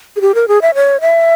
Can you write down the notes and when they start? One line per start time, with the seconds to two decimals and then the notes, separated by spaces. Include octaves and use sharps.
0.16 G#4
0.21 G4
0.35 A#4
0.48 G#4
0.62 E5
0.75 C#5
1.01 E5